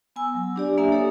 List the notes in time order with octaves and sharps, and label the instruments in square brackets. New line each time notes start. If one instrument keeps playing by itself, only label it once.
[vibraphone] B3 G#5 E6
F#3
D4 G4 D5
A#3 D4 E5 G#5 D#6
G4 A4 C#5